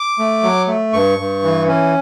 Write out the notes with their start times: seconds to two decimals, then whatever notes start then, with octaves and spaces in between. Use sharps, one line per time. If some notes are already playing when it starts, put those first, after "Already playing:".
Already playing: D6
0.19 A3
0.43 F#3
0.68 A3
0.93 G2 C#6
1.19 G2
1.44 E3
1.68 C#4